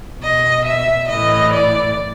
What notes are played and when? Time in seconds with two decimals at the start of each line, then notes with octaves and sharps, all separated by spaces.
0.21 B2 D#5
0.64 E5
1.07 A2 E3 D#5
1.52 D5